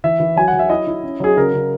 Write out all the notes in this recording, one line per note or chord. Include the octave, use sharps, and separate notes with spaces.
E3 E5
E3
F#3 G#5
F#5
F#3
E5
E4 D#5
E4
C#4
F#3 G#4
C#3 A#4
C#3